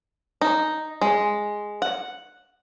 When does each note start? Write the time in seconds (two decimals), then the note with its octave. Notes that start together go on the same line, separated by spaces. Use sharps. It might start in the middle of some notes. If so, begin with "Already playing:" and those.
0.41 D#4
1.01 G#3
1.82 F#5